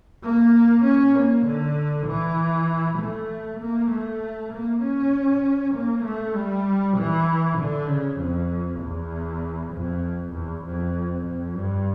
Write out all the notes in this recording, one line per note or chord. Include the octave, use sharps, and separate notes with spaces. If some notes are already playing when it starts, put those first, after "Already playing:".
A#3
C#4
A#3
D3
E3
A3
A#3
A3
A#3
C#4
A#3
A3
G3
E3
D3
C#3
F2
E2
F2
E2
F2
F2
G2